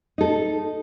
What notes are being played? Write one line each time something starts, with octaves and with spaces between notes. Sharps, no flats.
D#4 A4